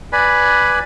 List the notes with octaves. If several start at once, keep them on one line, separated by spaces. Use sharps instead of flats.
B4 D5 G#5 B5